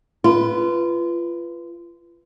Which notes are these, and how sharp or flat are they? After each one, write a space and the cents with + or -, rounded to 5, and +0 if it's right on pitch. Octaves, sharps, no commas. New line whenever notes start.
F4 -25 B4 +0